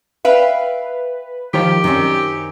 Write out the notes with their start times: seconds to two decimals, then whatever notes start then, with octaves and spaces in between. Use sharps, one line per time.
0.25 B4 E5 F5 G5
1.54 D#3 F3 G4
1.84 F#2 D#3 C4 C#4